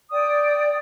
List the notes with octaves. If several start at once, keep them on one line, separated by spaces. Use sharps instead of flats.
D5 G5 D#6